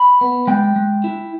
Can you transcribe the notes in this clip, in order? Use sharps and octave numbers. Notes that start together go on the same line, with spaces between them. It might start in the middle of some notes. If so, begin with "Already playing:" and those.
Already playing: B5
B3
G#3 G5
G#3
E4